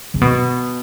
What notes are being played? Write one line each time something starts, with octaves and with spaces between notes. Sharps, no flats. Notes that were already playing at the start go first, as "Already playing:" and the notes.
C#3
B2